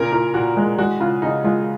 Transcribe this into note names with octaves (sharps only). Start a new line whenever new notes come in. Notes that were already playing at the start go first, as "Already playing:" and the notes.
Already playing: A#2 C#3 A#4
A#2 A#4
A#2 F#4
G#3
G#3 F#4
C#3 F4
C#3 D#4
G#3 F4